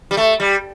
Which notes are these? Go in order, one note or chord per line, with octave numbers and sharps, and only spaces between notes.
G3
A3
G3